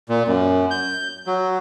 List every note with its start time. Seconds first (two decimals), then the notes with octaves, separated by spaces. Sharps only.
0.09 A#2
0.27 F#2
0.71 G6
1.27 F#3